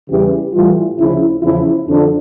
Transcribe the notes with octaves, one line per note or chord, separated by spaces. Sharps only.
E2 C#3 E3 G3 G4
A2 E3 G3 F4
D2 C#3 F3 E4
E2 C#3 F3 E4
F2 D3 F3 D4